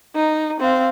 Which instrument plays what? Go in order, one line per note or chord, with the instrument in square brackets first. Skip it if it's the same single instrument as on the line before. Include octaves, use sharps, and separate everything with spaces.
[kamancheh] D#4
C4 F5